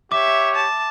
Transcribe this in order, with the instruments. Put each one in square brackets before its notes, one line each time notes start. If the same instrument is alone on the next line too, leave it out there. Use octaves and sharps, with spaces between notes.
[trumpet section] G4 C#5 [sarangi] E5 [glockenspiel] D6
[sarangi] A5